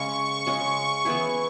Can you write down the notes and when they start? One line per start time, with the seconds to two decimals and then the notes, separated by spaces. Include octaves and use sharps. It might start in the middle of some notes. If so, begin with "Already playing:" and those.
Already playing: C#3 G#3 C#4 C#6
0.47 C#3 G#3 C#4
1.05 E3 B3 E4 G#4